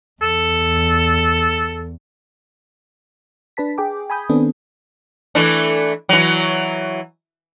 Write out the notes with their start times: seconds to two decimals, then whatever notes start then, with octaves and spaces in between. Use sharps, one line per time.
0.22 E2 A4
3.57 D4 B4 A5 B6
3.78 G#4 G5 D6
4.10 G#5 B5 D#6 G6
4.29 D#3 B3 C4 D4 A4
5.35 E3 A3 D4
6.09 E3 F#3